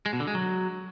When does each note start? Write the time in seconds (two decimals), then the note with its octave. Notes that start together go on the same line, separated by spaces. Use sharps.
0.06 G#3
0.13 B2
0.20 D3
0.27 G#3
0.35 F#3